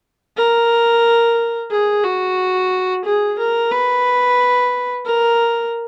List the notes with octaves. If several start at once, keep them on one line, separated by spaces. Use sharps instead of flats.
A#4
G#4
F#4
G#4
A#4
B4
A#4